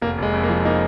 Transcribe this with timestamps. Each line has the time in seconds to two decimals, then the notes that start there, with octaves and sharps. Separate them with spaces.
0.02 F1 A#3
0.18 F1 G#3
0.33 F2
0.43 A#3
0.49 F3
0.65 A#3 D#4